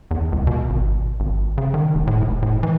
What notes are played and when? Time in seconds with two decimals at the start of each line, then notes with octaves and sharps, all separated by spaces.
0.11 E2
0.32 C#2
0.47 B2
0.70 G#1
1.20 G#1
1.58 C#3
1.74 D#3
1.95 F1
2.07 A2
2.22 F1
2.42 A2
2.63 E3